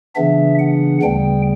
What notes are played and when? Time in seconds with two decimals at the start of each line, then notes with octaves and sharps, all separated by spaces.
0.15 C#3 E3 B3 D4 E5
0.59 F#5
1.02 D2 C#3 G3 B3 G5